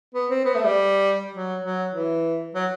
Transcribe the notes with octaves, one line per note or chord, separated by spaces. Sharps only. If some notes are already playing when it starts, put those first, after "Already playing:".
B3
C4
B3
A3
G3
F#3
F#3
E3
F#3